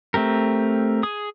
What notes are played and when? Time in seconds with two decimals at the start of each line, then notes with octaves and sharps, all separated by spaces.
0.14 A3 C4 G4 A#4
1.03 G#4 D#6